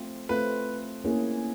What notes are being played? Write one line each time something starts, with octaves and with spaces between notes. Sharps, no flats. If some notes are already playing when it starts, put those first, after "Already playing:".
Already playing: A3 C4 F4
A3 C4 F4 B4
A#3 C#4 E4 G#4